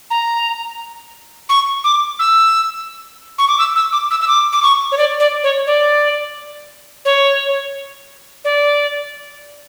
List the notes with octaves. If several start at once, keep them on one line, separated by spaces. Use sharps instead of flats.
A#5
C#6
D6
E6
C#6
D6
E6
E6
D6
E6
E6
D6
D6
C#6
C#5
D5
D5
C#5
D5
C#5
D5